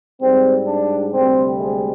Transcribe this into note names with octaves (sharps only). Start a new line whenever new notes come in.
G#2 G3 C4
D4
D2 C3 G3 C4
G#3